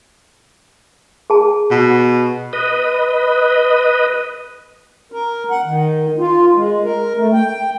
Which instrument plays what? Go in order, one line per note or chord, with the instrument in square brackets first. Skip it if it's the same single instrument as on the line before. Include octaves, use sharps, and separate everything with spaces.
[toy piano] G#4 A5
[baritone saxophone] B2
[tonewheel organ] B4 D#5
[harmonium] A#4
F#5
D#3
F4
G#3
A#4
A3
G5